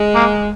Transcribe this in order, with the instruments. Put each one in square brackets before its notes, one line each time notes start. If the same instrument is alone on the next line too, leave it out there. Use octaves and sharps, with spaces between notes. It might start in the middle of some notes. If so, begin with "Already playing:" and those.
Already playing: [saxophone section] G#3
[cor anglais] A#3